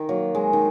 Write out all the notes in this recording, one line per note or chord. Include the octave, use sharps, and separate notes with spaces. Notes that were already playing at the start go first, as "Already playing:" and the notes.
Already playing: D#3
F#3 A#3
G#3
D#3